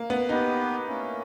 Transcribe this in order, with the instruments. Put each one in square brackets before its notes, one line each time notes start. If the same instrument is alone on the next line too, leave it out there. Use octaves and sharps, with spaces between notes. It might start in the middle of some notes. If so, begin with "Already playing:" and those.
Already playing: [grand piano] A#3
B3
[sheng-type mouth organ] B3 G4 B4 [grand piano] D#4
[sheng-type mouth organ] A#3 C#4 E4